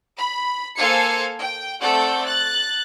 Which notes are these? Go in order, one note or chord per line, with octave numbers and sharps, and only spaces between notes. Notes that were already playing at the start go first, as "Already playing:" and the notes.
B5
A#3 A4 C5 F5 G#5 C#7
G5
A3 C4 A4 D5 F#5 G6
F#6 A6